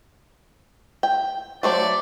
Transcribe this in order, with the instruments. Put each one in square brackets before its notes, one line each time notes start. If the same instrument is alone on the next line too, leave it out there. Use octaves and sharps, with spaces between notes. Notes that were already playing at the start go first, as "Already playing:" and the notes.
[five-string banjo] G5
[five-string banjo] F#3 A3 C5 [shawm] D5